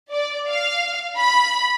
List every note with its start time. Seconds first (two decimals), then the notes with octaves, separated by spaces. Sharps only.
0.12 D5
0.48 F5
1.18 B5